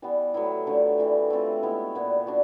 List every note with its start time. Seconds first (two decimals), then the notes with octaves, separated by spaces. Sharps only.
0.02 E3 G3 B3
0.34 A2 F#3 B3 E4
0.67 D3 F3 A3
0.98 A2 E3 G3
1.30 A3 C4 F4
1.63 G#3 B3 E4
1.95 A#2 G3 B3 E4
2.27 D4 F#4